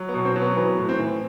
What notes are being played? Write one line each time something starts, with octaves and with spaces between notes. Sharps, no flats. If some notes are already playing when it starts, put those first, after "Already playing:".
Already playing: F#3
B3
B2
C4
F#3
B3
E3 B3
A2
C4
E3